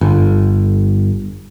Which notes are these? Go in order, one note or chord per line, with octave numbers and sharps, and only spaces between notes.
G1